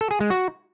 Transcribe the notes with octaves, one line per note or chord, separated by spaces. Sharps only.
A4
G#4
G#3
F#4